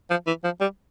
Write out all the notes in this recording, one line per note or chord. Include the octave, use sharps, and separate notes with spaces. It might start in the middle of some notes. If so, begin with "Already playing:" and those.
F3
E3
F3
G3